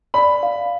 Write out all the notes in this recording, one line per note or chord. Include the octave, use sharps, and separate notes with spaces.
D5 B5
F5